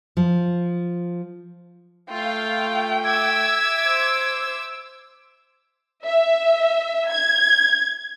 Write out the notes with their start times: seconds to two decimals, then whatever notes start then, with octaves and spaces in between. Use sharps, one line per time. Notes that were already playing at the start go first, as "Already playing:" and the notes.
0.17 F3
2.11 A3 F4 F5 G5
3.04 E5 D6 E6 G#6
3.88 C5
6.05 E5
7.10 G#6